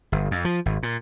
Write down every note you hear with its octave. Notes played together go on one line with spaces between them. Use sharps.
G1
F2
F3
G#1
A#2